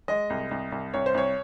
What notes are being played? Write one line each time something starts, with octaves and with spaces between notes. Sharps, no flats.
G#3 D#5
C2
C2
C2
C2 C#5
C5
C2 C#5